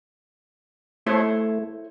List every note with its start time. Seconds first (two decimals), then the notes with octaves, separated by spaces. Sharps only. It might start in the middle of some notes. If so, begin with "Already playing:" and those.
1.06 A3 E4 C5 C#5